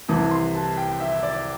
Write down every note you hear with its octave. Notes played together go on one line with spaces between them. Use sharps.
C2 C3 E3 A5
C6
A5
G5
E5
D5